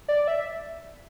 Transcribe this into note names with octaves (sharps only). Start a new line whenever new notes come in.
D5
E5